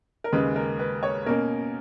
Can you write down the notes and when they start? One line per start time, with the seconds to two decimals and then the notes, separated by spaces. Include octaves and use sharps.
0.24 A#4
0.32 D#2 C#3 G#3 B4
0.56 A#4
0.79 B4
1.03 C#5
1.26 B2 A#3 C#4 A#4